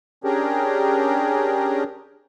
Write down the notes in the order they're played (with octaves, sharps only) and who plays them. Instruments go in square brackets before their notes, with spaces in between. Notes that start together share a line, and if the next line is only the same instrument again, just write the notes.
[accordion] C#4 D4 G4 G#4 A#4